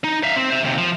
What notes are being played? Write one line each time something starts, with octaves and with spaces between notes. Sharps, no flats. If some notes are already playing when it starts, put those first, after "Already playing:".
D#4
E5 F5
C4
C5 E5
D#2 C3
F3